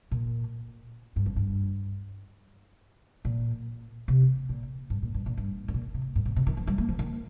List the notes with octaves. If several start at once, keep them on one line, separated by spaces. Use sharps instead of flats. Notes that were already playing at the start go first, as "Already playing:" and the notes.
A#2
G2
F2
G2
A#2
C3
A#2
G2
A#2
G2
A#2
G2
G2
A#2
C3
G2
A#2
C3
D#3
F3
G3
A#3
F3
D#3